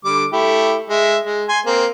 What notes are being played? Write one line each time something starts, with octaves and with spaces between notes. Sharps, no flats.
D3 G3 D6
A3 E4 G4
G#3 E5
G#3
G#5 C6
A#3 C4